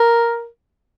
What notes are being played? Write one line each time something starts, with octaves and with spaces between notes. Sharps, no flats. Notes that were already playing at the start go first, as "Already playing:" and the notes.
Already playing: A#4